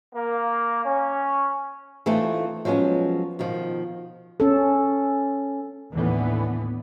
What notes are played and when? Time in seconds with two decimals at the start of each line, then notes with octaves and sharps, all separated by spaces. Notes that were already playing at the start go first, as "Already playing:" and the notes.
0.14 A#3
0.85 C#4
2.06 E3 A3 C4 D#4 F4 A4
2.65 F3 F#3 G#3 B3 C#4
3.39 B2 D#3 F3
4.40 C#4 A4
5.92 D#2 A2 D3 E3 B3